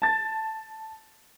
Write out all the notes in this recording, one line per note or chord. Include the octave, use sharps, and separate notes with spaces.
A5 A6